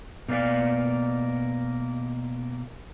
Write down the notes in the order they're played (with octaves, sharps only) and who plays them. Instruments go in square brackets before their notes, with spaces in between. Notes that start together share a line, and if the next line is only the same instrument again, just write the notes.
[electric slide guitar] B2 A#3 G#4 D5 F5